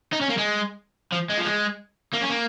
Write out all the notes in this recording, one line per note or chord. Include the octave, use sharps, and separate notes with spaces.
D#4
C#4
A#3
G#3
F3
G#3
F3
G#3
A#3
C#4
A#3